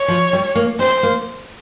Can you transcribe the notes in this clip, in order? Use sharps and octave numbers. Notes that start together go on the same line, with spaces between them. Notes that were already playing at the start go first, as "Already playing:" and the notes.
Already playing: C#5
F3
G3
A#3
C4 C5
A#3